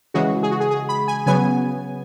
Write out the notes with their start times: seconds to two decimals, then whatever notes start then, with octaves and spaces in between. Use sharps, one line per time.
0.14 C#3 E3 G#3 F#4
0.43 G#4
0.51 F#4
0.60 G#4
0.71 G#4
0.89 B5
1.08 G#5
1.26 C#3 F#3 B3 G#5